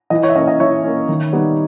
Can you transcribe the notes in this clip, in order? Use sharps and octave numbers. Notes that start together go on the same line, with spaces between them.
E3 D#5
C#5
E5
A#3 C#4 D#5
D#5
E3 C#5 E5
A#3 C#4
D#3
G3 B3 D#4